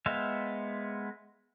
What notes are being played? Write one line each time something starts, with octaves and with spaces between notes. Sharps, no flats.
G#3 B3 C5 E5 F5